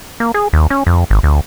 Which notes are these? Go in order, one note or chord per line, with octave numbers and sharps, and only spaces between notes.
A#3
G#4
D#2
C#4
F2
G#1
D2